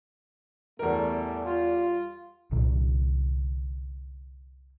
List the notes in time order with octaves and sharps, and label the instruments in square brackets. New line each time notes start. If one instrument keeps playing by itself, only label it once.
[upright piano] E2 A#4 [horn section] A2 G3 A3
[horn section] G3 F4
[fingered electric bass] C2 A#2 D3 F#3